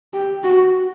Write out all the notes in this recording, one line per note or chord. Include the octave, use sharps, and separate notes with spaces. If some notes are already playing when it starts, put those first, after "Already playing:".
G4
F#4